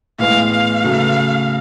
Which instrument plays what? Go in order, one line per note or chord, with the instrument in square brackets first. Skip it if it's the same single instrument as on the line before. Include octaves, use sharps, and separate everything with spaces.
[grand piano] A2 E3 G#3 B3 [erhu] F5
[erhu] F5
[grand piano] C#3 F#3 A3